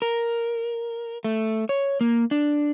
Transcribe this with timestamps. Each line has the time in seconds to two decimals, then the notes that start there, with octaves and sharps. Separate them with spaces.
0.02 A#4
1.24 A3
1.69 C#5
2.01 A#3
2.31 D4